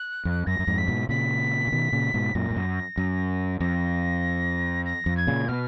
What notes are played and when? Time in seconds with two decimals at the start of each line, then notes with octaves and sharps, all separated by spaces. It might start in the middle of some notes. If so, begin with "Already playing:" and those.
Already playing: F#6
0.25 F2
0.47 F#2 A#6
0.59 F#2
0.67 F2 G#2
0.78 B6
0.88 G#2 B2
1.09 A#2 C#3 B6
1.67 C#3
1.72 B2 D#3
1.92 A#2 C#3
2.14 G#2 B2
2.35 F#2 A#2 A#6
2.51 G#2
2.56 F#2
2.97 F#2
3.60 F2 A#6
4.85 A#6
5.06 F2
5.17 G#6
5.27 A#2 C#3
5.48 B2 F6